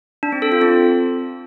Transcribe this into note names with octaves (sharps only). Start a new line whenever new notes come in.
D4
C4
A4
F4
C4